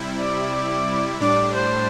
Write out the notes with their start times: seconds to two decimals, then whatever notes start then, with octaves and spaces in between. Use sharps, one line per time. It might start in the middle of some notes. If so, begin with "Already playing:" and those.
Already playing: C3 G3 E4
0.20 D5
1.20 A2 G3 D4 D5
1.55 C5